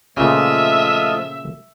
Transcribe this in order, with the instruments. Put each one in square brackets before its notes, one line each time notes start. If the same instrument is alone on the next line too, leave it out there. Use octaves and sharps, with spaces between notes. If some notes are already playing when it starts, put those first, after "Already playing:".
[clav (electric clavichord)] A#2 C#3 [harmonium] F3 A3 [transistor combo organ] F4 D#5 [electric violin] E5